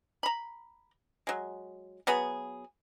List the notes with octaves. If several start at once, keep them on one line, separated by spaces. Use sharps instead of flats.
A#5 B5
F#3 G#3
F#3 B3 F#4 G#4